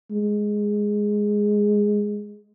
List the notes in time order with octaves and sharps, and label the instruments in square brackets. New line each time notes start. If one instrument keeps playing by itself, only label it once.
[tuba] G#3